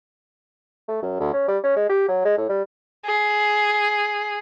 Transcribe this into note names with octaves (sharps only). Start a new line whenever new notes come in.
A3
F#2
D2
C#4
G3
C#4
G#3
G4
F#3
G#3
A2
G3
G#4